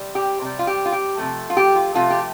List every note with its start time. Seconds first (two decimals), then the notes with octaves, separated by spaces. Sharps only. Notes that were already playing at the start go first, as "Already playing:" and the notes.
Already playing: C3 G3
0.15 G4
0.41 C3 G3
0.59 F4
0.67 G4
0.85 F4
0.92 G4
1.18 C3 F3 A3
1.50 F4
1.57 G4
1.75 F4
1.94 C3 F3 A3 F4
2.10 G4